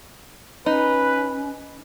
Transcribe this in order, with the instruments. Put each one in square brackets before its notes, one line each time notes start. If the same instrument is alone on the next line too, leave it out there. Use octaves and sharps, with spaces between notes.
[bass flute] C#4 [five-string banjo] D#4 [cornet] B4